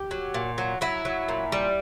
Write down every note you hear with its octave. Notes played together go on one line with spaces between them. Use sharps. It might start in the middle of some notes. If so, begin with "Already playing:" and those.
Already playing: G4
F#3
A#2
F#3
F#3 E4
F#3
A#2
G3